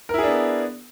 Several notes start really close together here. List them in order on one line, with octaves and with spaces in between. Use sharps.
A#4 E4 G#4 D4 B3